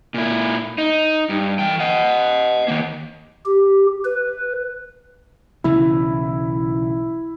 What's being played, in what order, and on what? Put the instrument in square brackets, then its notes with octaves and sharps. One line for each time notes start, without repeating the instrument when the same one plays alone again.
[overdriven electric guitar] A#2 E4
D#4
G2
E3 G5
D#5 F#5
D#3 A#3
[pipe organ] G4
B4
[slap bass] B1 C#3 E3 [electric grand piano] E4